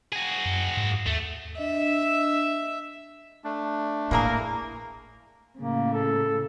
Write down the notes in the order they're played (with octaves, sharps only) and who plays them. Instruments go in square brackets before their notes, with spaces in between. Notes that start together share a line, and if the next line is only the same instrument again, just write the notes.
[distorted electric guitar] F#4 G#4
[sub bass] F#2
G#2
[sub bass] D#2 [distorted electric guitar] A3
[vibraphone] D4 D#5 [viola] E5
[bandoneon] A3 D4
[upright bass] G#1 A2 [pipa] E3 G#4 A#4 [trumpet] A#3
[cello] A2 C#3 [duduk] A#3
[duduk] A4